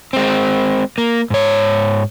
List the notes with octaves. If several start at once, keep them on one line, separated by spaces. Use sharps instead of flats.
G#3 C4
A#3
G#2 C#5